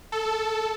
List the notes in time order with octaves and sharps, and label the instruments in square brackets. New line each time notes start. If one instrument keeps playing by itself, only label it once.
[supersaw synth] A4